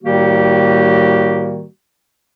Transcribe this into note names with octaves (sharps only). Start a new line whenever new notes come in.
A2 D#3 G3 A#3 F#4 G4